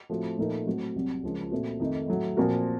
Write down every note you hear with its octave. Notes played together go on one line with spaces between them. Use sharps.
A2 F3 A3 C4 F#4
A#2 F3 A3 D#4 A#4
A2 F#3 C4 F#4
C2 C3 F#3
C#2 C#3 F3 A#3 C#4
A#2 A3 C4 F#4
F2 D#3 A3 D#4
A2 F#3 A3
A#2 F3 C4 F#4 A#4